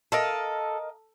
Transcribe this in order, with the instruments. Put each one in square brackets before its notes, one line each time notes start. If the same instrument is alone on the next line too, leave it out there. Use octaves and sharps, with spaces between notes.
[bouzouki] A4 [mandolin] A#4 D#5 F5